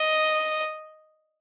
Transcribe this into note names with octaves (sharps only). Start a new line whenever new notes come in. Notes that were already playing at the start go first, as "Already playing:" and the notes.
Already playing: D#5